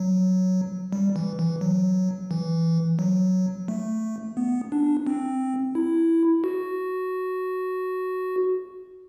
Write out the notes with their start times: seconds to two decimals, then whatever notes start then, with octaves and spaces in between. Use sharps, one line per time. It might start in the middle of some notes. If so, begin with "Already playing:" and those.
Already playing: F#3
0.93 G3
1.16 E3
1.39 E3
1.61 F#3
2.31 E3
2.99 F#3
3.68 A3
4.37 B3
4.72 D4
5.07 C4
5.75 E4
6.44 F#4